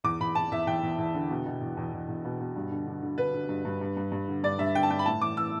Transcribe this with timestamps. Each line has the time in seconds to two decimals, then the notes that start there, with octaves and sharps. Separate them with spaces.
0.04 E2 D6
0.20 E2 B5
0.35 E2 A5
0.51 E2 E5
0.67 E2 G5
0.83 E2
0.98 E2
1.14 D3
1.30 B2
1.46 B2
1.61 E2
1.77 E2
1.93 E2
2.08 E2
2.25 B2
2.40 B2
2.56 G2
2.71 D3
2.87 D3
3.02 D3
3.18 D3 B4
3.34 D3
3.49 G2
3.65 G2
3.81 G2
3.97 G2
4.12 G2
4.28 D3
4.44 G2 D5
4.59 G2 E5
4.75 D3 G5
4.83 A5
4.90 G2 G5
4.99 B5
5.06 A2 A5
5.22 E3 D6
5.37 E3 E6